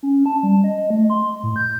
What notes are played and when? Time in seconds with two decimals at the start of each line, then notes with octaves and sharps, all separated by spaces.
0.03 C#4
0.26 A5
0.43 G3
0.64 D#5
0.90 A3
1.10 C6
1.43 A2
1.56 G6